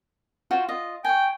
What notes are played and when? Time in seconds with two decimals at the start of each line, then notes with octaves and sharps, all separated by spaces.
0.51 F4 F#4 C5
0.69 F4 D#5
1.05 G5 G#5 C#6